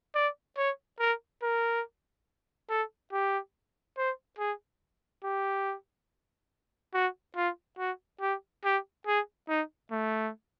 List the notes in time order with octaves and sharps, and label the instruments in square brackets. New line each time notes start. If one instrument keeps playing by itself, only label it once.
[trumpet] D5
C#5
A#4
A#4
A4
G4
C5
G#4
G4
F#4
F4
F#4
G4
G4
G#4
D#4
A3